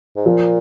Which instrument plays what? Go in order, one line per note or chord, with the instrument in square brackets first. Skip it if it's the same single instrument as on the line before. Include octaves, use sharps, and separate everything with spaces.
[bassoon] G#2
[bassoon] A#2 [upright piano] F3